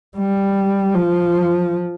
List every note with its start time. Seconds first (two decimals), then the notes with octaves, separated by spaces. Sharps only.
0.17 G3
0.94 F3